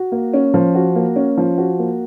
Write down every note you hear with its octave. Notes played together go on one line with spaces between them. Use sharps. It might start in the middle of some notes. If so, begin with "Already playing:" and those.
Already playing: F#4
A#3
C#4
F3
F#4
A#3
C#4
F3
F#4
A#3